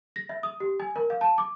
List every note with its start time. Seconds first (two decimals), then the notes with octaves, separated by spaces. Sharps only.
0.16 A#6
0.29 E5
0.43 D#6
0.60 G4
0.80 G#5
0.96 A#4
1.10 F5
1.21 A5
1.38 D6